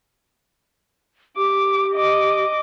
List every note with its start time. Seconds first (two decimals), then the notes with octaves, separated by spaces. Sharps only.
1.37 G4 D6
1.94 D#5 D6